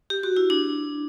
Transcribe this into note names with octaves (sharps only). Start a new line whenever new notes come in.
G4
F#4
E4
D4